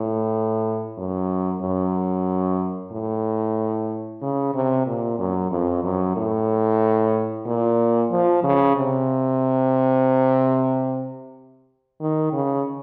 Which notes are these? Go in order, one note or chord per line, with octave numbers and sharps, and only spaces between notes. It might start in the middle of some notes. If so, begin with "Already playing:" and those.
Already playing: A2
F#2
F#2
A2
C#3
C3
A#2
F#2
F2
F#2
A2
A#2
F3
C#3
C3
D#3
C#3